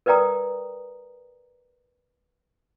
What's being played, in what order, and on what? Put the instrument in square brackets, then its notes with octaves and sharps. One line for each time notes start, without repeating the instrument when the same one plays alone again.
[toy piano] A#4 B4 D5 G5 A#5 D#6